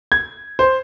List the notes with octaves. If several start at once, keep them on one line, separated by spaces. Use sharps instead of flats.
G#6
C5